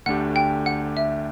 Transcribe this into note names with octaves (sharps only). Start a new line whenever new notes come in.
D2 D3 A3 D4 G4 F#5
G5
F#5
E5